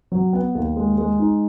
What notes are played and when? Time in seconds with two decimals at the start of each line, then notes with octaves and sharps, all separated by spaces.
0.12 F#3
0.33 B3
0.55 D#2
0.76 G#3
0.98 G#3
1.19 D#4